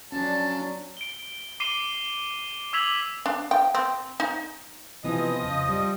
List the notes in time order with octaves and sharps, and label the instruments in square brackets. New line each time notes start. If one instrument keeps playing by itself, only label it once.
[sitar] D3 F3 D4 [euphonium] F#3 [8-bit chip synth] C#4 [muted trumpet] A5
[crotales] D7 G7
D6 C7 D#7 G7
D6 E6 G#6 B6 F7 F#7
[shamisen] D4
G5
C4
D#4
[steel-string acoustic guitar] C3 E3 B3 [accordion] F3 D#5 D#6
[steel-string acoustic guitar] F2 C#3
G3